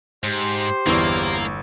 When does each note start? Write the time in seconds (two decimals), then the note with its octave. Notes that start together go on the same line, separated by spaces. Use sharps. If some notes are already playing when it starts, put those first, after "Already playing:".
0.24 G#2 G4 C5
0.86 G1 E2 A#3 E4 D5 C#6 E6